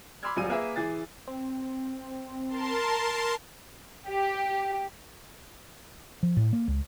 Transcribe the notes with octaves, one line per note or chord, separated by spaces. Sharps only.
B5 C6 D6 E6 F6 G#6
D#1 F#3 G3 F4 G#5 D#7
A#3 G#4 A#4 B4 E5
E3 G#4 A6
C4
A#4 A5 C6
G4
F3
A2
A#3
C#2